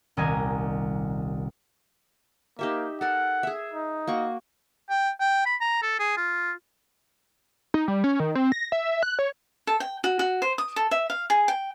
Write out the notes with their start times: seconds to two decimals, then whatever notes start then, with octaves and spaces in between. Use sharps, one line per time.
0.17 D#1 C2 G4 D#5 G#5 A#5
2.59 A#3 D#4 G4 E5
3.01 A4 A#4 F#5
3.43 G#4 E5
3.73 D#4
4.07 A#3 F#4 C#6
4.90 G5
5.20 G5
5.46 B5
5.61 A#5
5.82 A4
5.99 G#4
6.17 F4
7.74 D#4
7.88 G3
8.04 C#4
8.20 D#3
8.35 C4
8.52 A#6
8.72 E5
9.03 F#6
9.19 C#5
9.67 A4
9.80 G5
10.04 F#4
10.19 F#4
10.42 C5
10.58 D#6
10.76 A4
10.91 E5
11.10 F5
11.30 G#4
11.48 G5